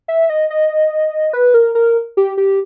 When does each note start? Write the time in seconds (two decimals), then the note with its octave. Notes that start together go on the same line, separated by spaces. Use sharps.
0.08 E5
0.30 D#5
0.50 D#5
1.33 B4
1.54 A#4
1.75 A#4
2.17 G4
2.37 G4